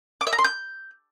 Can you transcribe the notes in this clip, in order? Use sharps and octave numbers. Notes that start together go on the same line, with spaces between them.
D6
E5
A#5
C6
G6